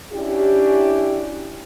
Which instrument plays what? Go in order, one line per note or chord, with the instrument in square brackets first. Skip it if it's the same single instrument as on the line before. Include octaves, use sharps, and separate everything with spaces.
[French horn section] C#4 D4 E4 F#4 G4